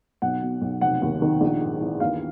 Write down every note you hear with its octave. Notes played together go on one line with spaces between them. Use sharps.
B1 F#5
B2
B1
F1 F#5
D#2
D#3
A#1
G#2
E3
D#2 F5